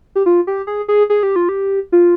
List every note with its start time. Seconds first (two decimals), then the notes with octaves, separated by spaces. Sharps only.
0.16 G4
0.26 F4
0.47 G4
0.67 G#4
0.88 G#4
1.10 G#4
1.23 G4
1.36 F4
1.49 G4
1.92 F4